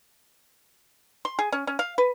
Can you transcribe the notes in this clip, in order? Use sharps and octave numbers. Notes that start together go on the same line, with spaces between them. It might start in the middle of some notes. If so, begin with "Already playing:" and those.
C6
G#4
C#4
C#4
F5
B4